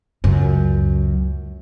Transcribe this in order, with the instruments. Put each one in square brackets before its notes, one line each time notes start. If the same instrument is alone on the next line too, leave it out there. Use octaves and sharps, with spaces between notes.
[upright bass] C#2 F#2